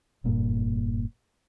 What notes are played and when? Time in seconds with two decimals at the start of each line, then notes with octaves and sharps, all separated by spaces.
0.24 F1 G2 A#2